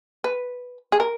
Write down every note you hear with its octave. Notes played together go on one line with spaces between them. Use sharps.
B4
G#4
A#4